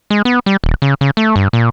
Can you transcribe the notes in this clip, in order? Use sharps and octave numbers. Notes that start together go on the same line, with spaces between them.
G#3
B3
G3
D#1
C#3
C#3
A3
G2
A#2